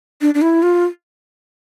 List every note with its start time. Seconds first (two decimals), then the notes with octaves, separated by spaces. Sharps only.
0.21 D4
0.34 D4
0.42 E4
0.62 F4